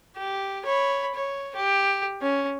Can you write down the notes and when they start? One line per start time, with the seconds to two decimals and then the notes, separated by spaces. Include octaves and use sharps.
0.17 G4
0.66 C#5 B5
1.14 C#5
1.55 G4
2.21 C#4